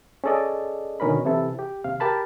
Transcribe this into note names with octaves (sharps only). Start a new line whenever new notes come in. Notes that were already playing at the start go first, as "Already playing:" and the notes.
C#4 G#4 A4 D5 D#5
B2 D3 D#3 C#4 A#4 B5
C3 E3 C4 E4 A4
G4
D#2 C3 F5
G4 A#4 A5 B5